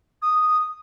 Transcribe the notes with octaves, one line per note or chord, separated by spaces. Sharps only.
D#6